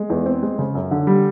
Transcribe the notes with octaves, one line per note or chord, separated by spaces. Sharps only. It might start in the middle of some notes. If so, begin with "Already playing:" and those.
Already playing: G#3
E2
C4
G#3
C#3
F#2
D3
G3